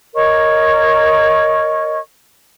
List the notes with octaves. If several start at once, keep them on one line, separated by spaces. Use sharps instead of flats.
A#4 C#5 D#5 C#6